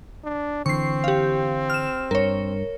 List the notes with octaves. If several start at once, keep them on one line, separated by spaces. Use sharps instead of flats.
D4
D3 E3 C4 C#6 C7
G4 F5
F6 E7
G2 A#4 C#5